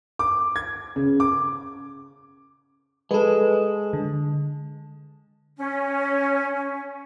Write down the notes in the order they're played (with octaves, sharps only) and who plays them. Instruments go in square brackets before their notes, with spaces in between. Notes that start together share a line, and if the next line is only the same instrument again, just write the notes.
[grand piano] D6
G#6
C#3
D6
[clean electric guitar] G#3 [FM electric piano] A4 B4
[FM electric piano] D3
[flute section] C#4